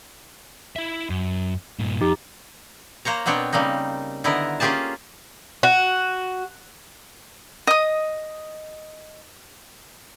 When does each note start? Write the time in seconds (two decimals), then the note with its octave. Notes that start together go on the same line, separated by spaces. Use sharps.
0.76 E4 E5
1.10 F#2
1.79 G2 A#2
2.01 F2 D#4 G4
3.05 A#3 C5 C#5 A#5
3.26 B2 B3 C4 D4 C#5 G5
3.53 C#3 G3 A#3 C4 D#4
4.24 D3 D#3 B3 E4 A#4
4.60 A#3 C#4 F4 G4 G#4 A5
5.63 F#4
7.67 D#5 D#6